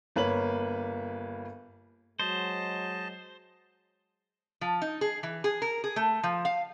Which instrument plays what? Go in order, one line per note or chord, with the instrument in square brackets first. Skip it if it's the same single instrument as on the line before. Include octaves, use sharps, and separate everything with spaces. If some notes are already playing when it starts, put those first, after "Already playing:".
[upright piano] G1 A#3 B4 C#5 F#7
[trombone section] F#3 G#3 [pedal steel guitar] C5 [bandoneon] D#5 A5
[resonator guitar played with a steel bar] F3
D#4
G#4
E3
G#4
A#4
G#4
A3
F3
F5